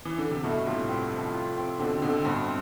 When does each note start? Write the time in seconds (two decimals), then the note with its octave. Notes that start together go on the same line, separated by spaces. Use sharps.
0.05 E3
0.18 D3
0.31 C3
0.44 G2 B2 A3
0.66 A2 C3 F4
0.89 C4
1.12 F3
1.34 F4
1.57 C4
1.79 B2 D3 C4
2.02 B2 D3 C4
2.25 G2 B2 C4